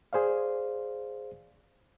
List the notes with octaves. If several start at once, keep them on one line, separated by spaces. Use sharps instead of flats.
G#4 C5 D5 F5